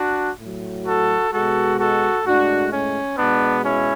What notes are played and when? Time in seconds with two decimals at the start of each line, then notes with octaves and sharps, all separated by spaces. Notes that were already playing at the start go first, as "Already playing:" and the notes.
Already playing: D4 F#4
0.40 A2 F#3
0.86 F#4 A4
1.32 B2 G#3 F#4 A4
1.79 F#4 A4
2.25 A2 G#3 D4 F#4
2.72 C#4
3.17 B2 G#3 B3 D4
3.65 C#4 E4